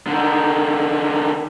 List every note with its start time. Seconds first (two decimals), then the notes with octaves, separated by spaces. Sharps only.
0.07 D3 D#3